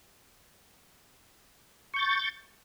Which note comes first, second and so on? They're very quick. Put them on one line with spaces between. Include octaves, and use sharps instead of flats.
C#6 G6 A6